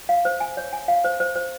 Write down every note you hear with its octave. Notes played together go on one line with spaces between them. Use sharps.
F5
C5
G#5
C#5
G#5
F5
C5
C5
C5